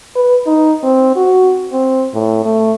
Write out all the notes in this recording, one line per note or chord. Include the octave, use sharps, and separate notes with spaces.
B4
D#4
C4
F#4
C4
A2
A3